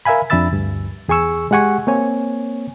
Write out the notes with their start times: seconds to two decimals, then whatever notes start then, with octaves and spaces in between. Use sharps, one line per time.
0.05 A#4 E5 F5 G#5 B5
0.30 F2 D4 E5 B5 E6 A6
0.51 D2 G2
1.08 E2 G#4 G#5 C#6 E6
1.51 G#3 G4 F#5 G#5 C#6
1.87 A#3 C4 C#5 G#5